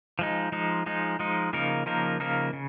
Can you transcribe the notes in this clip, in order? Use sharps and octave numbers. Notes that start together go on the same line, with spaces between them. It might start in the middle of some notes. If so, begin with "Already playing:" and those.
F3 G#3 D#4
F3 G#3 D#4
F3 G#3 D#4
F3 G#3 D#4
C#3 F3 A#3 D#4 A#4
C#3 F3 A#3 D#4 A#4
C#3 F3 A#3 D#4 A#4
C#3